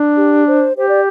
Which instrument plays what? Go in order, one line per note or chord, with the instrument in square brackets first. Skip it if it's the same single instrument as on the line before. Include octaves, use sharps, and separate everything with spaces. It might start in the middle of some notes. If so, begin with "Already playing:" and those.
Already playing: [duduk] D4
[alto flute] G4
C5
[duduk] G4 [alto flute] C5
[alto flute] D5